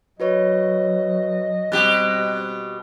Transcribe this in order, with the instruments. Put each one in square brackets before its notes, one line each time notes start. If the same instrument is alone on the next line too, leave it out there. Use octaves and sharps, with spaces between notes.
[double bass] F#3 [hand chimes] F#4 B4 C#5 [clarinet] D#5
[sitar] B2 G4 [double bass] G3 C4 [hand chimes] F#6